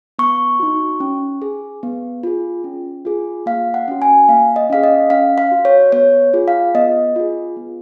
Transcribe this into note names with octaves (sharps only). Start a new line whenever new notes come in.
B3 C#6
D#4 F#4
C#4
G#4
B3
F4 G#4
C#4
F4 G#4
A#3 F5
F#5
C#4 F#4
G#5
A#3 F5
D#5
C#4 G#4 F5
D#5
C#4 F5
F5
F#4
C#5
B3 C#5
F4 G#4
F5
B3 D#5
F4 G#4
B3